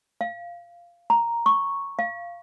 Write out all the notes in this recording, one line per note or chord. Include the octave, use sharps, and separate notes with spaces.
F5
A#5
C#6
F5